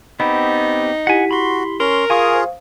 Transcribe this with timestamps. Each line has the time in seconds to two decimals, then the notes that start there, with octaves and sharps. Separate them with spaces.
0.20 B3 C4 D#4 G4 B5
1.07 E4 G4 F#5 G#5 B6
1.31 F#4 B5 C6
1.80 C#4 A#4 C6
2.10 F4 G#4 F5 G#5 C#6 D#6
2.30 C5 F5